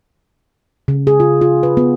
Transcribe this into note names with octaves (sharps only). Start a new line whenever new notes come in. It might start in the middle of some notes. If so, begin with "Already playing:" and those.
C#3
G#4
F4
F4
B4
B3